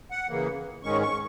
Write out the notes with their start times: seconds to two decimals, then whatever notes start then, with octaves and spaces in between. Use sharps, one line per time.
0.11 F#5
0.28 C#3 E3 A#3
0.83 G#2 D#3 G#3 C#4 C#6
1.02 C#6